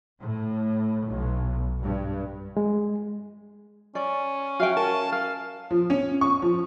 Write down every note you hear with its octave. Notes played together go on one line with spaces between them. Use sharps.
A2
B1
G2
G#3
C#4 D5
F#4 E5 F5 G5
A#4 A5
A#4 F5
F3
C#4
C#6
F3